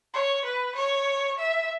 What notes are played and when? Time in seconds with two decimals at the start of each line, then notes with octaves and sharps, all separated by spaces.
0.14 C#5
0.45 B4
0.75 C#5
1.38 E5